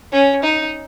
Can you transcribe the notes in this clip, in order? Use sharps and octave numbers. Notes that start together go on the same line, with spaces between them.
C#4
D#4